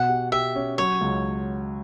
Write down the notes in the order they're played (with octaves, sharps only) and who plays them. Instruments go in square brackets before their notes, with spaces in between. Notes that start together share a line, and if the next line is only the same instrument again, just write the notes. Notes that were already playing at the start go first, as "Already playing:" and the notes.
Already playing: [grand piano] B2 [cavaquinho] F#5
[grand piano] G4
[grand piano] G4 [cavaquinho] E5
[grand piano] C#4
[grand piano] F#3 [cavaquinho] C#5
[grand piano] C#2